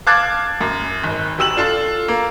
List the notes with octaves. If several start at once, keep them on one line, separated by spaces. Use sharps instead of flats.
F5 A5 D6 F#6 G#6 A6
F#2
G#1
F#1 F#3 G4 E6 E7 F#7
D4 F4 A4
A#3